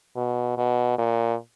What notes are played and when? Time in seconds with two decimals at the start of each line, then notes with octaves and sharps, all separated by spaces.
0.16 B2
0.57 B2
0.98 A#2